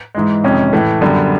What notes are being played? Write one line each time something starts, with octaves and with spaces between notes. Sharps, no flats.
G#2 E3 G#3
F2 C3 D#3 G#3 C#4
A2 E3 A3
F#2 D3 G3 B3